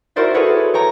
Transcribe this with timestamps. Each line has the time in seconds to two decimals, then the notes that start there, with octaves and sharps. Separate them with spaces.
0.16 E4 F#4 A#4 C5 D5 E5
0.34 F#4 G#4 A4 B4 C#5
0.74 C#5 G5 A#5